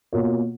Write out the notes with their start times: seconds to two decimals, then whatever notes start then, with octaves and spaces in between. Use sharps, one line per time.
0.12 B2 A#3 F4 A#4 C#5